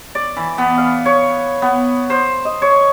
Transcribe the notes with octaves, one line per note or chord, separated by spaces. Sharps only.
D5
E3
B3
F5
C#5
B3
C5
D#5
C#5